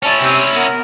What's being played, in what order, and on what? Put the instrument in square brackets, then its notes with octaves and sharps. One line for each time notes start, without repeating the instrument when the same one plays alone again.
[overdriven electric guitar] C#4 E4 [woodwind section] C#5 D5 A5
[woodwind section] C3 C4
B3 A#4